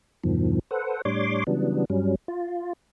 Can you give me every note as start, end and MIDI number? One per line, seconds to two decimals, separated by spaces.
0.24 0.59 40
0.24 0.59 43
0.24 0.59 47
0.24 0.59 51
0.24 0.59 53
0.71 1.02 69
0.71 1.02 71
0.71 1.02 72
0.71 1.02 78
1.05 1.44 45
1.05 1.44 55
1.05 1.44 62
1.05 1.44 73
1.05 1.44 84
1.05 1.44 86
1.47 1.85 49
1.47 1.85 52
1.47 1.85 54
1.47 1.85 55
1.47 1.85 59
1.47 1.85 62
1.90 2.15 43
1.90 2.15 54
1.90 2.15 55
1.90 2.15 61
2.28 2.73 65